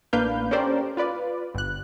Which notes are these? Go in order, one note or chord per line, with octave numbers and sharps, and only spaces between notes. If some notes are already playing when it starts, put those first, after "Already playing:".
A1 A#3 D4 B4 F5 G6
C#4 G4 A4 A#4 C5 D5
F4 B4 D5
G1 F#6